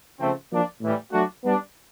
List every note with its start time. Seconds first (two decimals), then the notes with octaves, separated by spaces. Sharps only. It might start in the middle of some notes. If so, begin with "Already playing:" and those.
0.20 C#3 F3 A3 C4
0.50 F3 A#3 D4
0.81 A2 E3 G3
1.12 F#3 A3 D4 F#4
1.43 G3 B3 D4